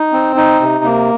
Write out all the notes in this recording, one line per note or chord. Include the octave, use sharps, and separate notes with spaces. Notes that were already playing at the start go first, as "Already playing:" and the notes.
Already playing: D#4
C4
D#4
C3
A#3